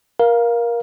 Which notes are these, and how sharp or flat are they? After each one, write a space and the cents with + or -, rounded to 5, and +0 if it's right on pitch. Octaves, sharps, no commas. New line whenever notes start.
A#4 +20 F5 +0